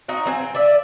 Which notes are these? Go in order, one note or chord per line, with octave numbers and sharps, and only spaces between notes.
C4 D#4 F#4
F#3 C4 G#5
C4
D5 E5